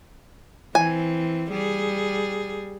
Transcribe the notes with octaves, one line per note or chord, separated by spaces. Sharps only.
E3 C4 G#5
G3 G#4